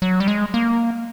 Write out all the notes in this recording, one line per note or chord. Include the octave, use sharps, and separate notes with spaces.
F#3
G3
G#3
A#3